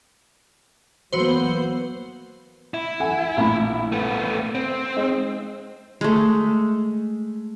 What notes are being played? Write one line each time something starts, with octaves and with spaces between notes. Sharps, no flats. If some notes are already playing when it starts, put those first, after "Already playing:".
E3 F#3 A#3 B3 F#4 C5
E4
A4 F#5 G#5
A#1 A2 B5
A3 B3
C4
G#3 D#4
G#3 A3